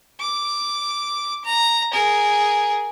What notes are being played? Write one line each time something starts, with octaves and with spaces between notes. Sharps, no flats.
D6
A#5
G#4 A#4